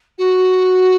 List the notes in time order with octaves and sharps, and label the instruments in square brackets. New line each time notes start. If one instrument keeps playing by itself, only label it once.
[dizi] F#4